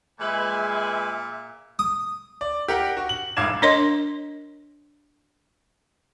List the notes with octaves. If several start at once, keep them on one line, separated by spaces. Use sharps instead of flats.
A#2 G#3 B4 E5 G#5
D#6
D5
G4 A#4 F#5
F#4
F#7
F1 G#2 F5 D6 G#6 E7
D4 A#4 C#5 D#5 C6